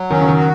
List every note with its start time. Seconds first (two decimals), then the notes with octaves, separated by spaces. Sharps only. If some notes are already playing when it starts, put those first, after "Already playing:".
Already playing: F#3
0.11 D#3 C#4
0.21 C#3
0.28 D#3
0.37 F#4